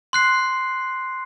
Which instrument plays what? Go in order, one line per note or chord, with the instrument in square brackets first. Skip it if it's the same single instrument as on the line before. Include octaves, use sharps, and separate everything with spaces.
[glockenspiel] C6 F#6 C7